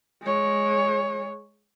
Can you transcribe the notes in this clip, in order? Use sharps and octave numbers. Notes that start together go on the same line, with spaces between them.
G#3 C#5